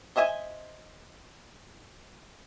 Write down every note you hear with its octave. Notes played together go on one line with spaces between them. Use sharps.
C5 D#5 E5 G#5